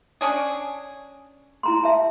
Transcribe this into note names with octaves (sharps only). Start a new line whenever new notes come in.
C#4 D4 G#4
E4 A#5 C6
E5 A5